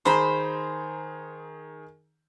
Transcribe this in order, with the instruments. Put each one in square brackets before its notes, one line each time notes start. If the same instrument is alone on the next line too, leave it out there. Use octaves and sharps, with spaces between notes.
[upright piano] D#3 G#4 A#5 [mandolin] C5 B5